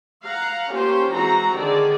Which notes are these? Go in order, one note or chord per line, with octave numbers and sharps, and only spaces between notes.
F5 F#5 A#5
A#3 C#4 F4 G4 C5
E3 G#3 C4 F#4 A#5
D3 D#3 G#4 D5